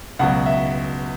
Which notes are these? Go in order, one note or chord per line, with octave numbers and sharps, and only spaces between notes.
C#2 B2 F#3 F#5
E5